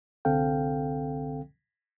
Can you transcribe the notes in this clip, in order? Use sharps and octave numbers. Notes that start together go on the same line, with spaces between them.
C2 D3 C4 A4 F5 G5